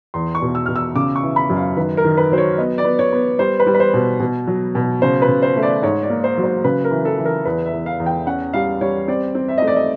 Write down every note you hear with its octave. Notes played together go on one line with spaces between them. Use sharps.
E2 C6
C#6
B2
E6
B2 F6
E6
C#3 D6
C#6
E3
B5
F#2
F5
D#3 B4
A#4
D#3
B4
F#3 C5
C#5
B3 D#5
D5
B3
C#5
B3
G3 C5
B4
G3
B4
C5
B2
B2
F#3
B2
C#3 C5
B4
C#3
C5
A3
D5
G#2 C#5
D5
A#3
C5
F#3
C5
C#3 B4
A#4
E3
A4
E3
A#4
E2 B4
E5
E2
F5
E2
G5
C#4 F#5
G3 F5
G3 C#5
C4 D5
C4
E5
D#5
A3
D5
D#5